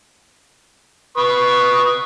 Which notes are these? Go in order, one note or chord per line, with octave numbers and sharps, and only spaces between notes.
B4 C#6 D#6